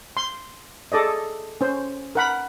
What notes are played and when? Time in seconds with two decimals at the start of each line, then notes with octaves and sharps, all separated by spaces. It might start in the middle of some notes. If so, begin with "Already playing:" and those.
0.17 C6
0.92 G#4 A4 D5 D#5
1.61 C#4 C5
2.15 A#4 F#5 B5